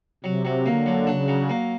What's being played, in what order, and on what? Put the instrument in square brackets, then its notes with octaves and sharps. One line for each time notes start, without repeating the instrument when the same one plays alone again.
[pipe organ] C3 [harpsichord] F#3
[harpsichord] F#3
[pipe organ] D3 [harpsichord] A#3
[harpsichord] F#3
[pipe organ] C#3 [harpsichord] D4
[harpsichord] F#3
A#3